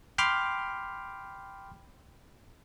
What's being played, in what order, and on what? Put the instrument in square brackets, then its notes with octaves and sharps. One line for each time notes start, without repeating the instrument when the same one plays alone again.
[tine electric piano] G5 B5 C6 D6 F6